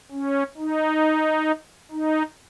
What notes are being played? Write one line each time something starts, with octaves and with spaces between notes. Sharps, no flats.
C#4
D#4
D#4